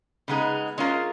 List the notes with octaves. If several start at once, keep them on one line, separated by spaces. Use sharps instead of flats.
C#3 G#3 B3 D#4 G#4
G#3 C#4 F4 A#4